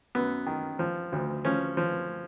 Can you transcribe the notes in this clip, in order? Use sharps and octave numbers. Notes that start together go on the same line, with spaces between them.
F#2 B3
D#3
F3
D2
F3 C#4
F3